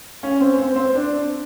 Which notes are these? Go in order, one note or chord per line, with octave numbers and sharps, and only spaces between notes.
C#4
C4
C4
C4
D4